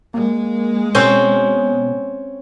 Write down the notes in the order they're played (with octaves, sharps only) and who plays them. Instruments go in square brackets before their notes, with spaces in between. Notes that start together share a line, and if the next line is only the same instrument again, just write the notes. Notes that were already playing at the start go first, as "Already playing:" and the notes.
[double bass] G#3 [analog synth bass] A#3
[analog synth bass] B2 [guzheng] C4 C#4 C5